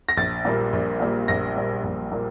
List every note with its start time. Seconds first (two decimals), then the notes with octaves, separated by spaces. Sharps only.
0.09 A#6
0.17 A#1 A6
0.45 A#2 G3 A#3
0.73 A#1
1.00 A#2 G3 A#3
1.28 A#1 A#6
1.56 A#2 G3 A#3
1.84 A#1
2.12 A#2 G3 A#3